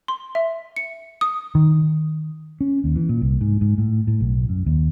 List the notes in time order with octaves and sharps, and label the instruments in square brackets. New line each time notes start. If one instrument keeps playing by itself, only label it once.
[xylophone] C6
E5
C#7
D#6
[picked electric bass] D#3
[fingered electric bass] C#4
D#2
E3
A#2
C2
G#2
G#2
A2
A2
B1
F#2
D#2